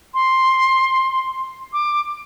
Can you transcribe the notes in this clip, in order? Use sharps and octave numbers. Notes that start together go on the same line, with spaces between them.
C6
D6